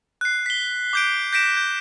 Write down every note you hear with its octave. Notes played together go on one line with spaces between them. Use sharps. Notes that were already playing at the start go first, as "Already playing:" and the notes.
F#6 C7
B6 G7
D6 G6 D7
G6 A#6 B6 D7 E7
G6